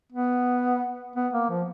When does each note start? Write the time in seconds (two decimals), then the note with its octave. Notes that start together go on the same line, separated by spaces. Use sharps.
0.13 B3
1.16 B3
1.33 A#3
1.50 F3